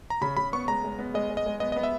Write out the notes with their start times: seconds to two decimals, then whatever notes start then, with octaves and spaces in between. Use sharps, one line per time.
0.10 A#5
0.21 C#3 B5
0.37 C#3 B5
0.53 B3 C#6
0.68 G#3 A#5
0.84 G#3
0.99 B3
1.14 G#3 D#5
1.30 G#3
1.37 D#5
1.46 G#3
1.60 B3 D#5
1.72 B3 D#5
1.83 E5